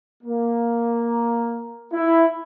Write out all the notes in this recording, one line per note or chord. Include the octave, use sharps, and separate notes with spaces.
A#3
E4